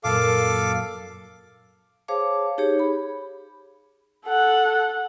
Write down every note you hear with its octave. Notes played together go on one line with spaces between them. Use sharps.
F#2 A#2 A4 F5 D6
G#4 C5 C#5 F5 A5 D6
D#4 G4 G#4 C#5
B5
A4 F#5